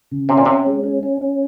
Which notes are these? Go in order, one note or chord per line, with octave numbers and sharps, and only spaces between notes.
C#3
C3 C#4
A#2
C3 C#4
G#3
C#4
C#4
C#4